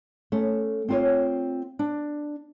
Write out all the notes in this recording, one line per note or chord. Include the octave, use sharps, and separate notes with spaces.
A3 C#4
C4 F4 C#5
D4